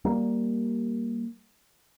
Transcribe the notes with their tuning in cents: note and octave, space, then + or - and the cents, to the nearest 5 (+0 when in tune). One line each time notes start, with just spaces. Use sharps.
G3 -5 A#3 +0